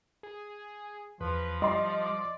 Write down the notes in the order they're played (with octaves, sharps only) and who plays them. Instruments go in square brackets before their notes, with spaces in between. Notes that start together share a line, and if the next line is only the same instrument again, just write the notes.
[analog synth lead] G#4
[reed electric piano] E2 [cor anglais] F3 [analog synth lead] B4
[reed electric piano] G3 [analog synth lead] D5 [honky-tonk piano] D#5 C6